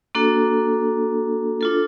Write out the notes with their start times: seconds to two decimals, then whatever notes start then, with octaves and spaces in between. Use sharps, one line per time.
0.15 A#3 D4 F#4 A4
1.61 D4 F4 A4